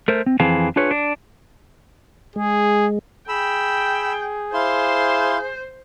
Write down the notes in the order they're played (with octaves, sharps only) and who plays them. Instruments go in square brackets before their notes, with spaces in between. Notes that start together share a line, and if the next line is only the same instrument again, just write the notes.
[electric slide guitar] A3 A#4 C5
C4
F2 E3 C4 G#4 F5 A5
D4 F4 G#4 B4 C#5
D4
[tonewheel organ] G#3 [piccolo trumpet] G#4
[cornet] G#4 [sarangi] G5 [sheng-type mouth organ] B5 E6
[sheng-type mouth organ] E4 F5 C6 [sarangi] C5